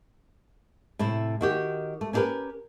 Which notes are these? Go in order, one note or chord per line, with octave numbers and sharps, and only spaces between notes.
A2 C3 E4
D#3 F#4 G4
A3
C#4 D4 G4 G#4 A#4 B4